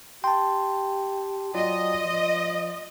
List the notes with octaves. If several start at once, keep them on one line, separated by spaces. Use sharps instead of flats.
G4 G5 A5 C6
F#3 F4 D5 D#5
F3